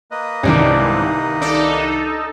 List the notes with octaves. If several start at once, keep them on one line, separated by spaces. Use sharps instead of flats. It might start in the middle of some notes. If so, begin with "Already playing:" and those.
A#3 B4 D#5
C2 G#2 C3 D#3 E3 C#4 D4
D4 D#4 A4